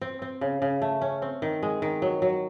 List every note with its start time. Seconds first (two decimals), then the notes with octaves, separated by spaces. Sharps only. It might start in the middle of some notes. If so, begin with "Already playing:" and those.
0.02 C4
0.22 C4
0.41 C#3
0.62 C#3
0.82 A3
1.01 C#4
1.22 C4
1.42 D#3
1.63 G#3
1.82 D#3
2.02 F#3
2.22 F#3